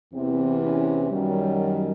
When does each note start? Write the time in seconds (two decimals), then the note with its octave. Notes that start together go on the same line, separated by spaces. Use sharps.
0.14 E2 C3 E3 C4
0.62 C#4
1.11 F#2 D#3 F#3 G3